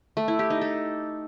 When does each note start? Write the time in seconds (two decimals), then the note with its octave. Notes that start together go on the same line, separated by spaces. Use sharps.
0.17 A3
0.28 E4
0.39 G4
0.50 D#4
0.61 A4